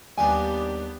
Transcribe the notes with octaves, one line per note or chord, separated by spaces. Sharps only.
D#2 G3 A#3 B3 D4 G4 G#5